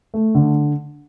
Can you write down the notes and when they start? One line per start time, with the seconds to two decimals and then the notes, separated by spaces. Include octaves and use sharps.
0.14 A3
0.35 D3